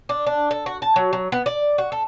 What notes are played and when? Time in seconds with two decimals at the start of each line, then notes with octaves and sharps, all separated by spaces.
0.09 D4
0.27 D4
0.51 A4
0.66 F#4
0.82 A5
0.96 F#3
1.13 F#3
1.32 B3
1.46 D5
1.78 F#4
1.92 A4